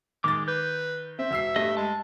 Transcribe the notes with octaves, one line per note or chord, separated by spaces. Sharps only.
D#3 G#3 D6 A6
B4 G6
C4 E5
E1 E6 C7
G2 G3 A3 D#5
G#3 A5